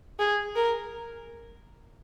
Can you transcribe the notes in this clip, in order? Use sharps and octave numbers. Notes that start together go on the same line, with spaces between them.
G#4
A#4